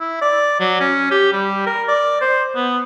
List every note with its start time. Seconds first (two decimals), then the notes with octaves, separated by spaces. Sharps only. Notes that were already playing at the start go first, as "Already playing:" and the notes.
0.01 E4
0.21 D5
0.60 F#3
0.80 C#4
1.11 G4
1.33 G3
1.67 A#4
1.88 D5
2.21 C5
2.55 B3